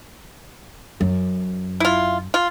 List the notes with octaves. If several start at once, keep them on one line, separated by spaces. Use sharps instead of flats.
F#2
E4 F4
F4